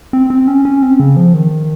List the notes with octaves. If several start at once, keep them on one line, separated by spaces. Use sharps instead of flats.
C4
C4
C#4
C#4
C4
C#3
F3
D#3